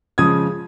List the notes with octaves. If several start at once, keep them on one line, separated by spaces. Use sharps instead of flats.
C#3 F3 G#3 D#6 G#6